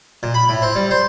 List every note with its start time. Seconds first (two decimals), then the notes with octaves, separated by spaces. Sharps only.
0.23 A#2
0.34 B5
0.49 A2
0.62 C4
0.75 G3
0.91 C5